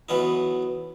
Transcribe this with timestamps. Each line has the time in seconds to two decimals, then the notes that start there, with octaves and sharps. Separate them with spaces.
0.09 E3 F#3 B3 C#4 D#4